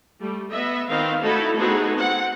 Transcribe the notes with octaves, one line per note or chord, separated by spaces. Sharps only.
G3 A3
B3 D#5 E5
D#3 B3 C4 F5
A3 D#4 E4 F#4 A4
A3 B3 C4 D#4 F#4 G#4
C4 F#5